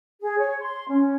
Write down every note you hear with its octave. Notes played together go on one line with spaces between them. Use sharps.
G#4
C#5
C6
C#4